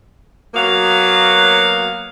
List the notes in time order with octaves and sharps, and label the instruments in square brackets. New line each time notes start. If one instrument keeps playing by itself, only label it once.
[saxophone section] F#3 A#3 B3 F#4 F5